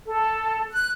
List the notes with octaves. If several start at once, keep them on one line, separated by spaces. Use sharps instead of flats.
A4
F#6